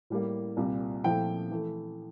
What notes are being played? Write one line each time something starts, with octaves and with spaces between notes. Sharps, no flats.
A2 G3 A#3
C2 A#2 G3
A#2 F3 A3 C4 E4 G5
E3 A3